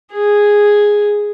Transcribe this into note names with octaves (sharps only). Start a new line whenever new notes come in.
G#4